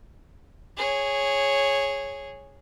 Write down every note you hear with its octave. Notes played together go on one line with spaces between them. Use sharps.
G#4 C#5